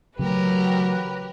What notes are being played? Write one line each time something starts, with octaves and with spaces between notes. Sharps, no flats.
C#3 E3 F#3 A3 G4 A#4 B4